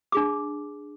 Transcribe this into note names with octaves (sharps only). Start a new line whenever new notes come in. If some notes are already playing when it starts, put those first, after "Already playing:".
D4 G#4 D6